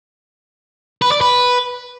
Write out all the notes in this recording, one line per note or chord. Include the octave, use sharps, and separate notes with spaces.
B4
D5
B4